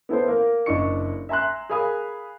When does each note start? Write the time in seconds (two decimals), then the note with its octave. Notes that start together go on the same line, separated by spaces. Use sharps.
0.09 B3 E4 A4 C5
0.28 A#3 A#4
0.66 F#1 D4 E4 D#5 C#6 C#7
1.29 E5 G#5 A#5 C6 F#6
1.69 G#4 A#4 F5 G#5 B5 D#6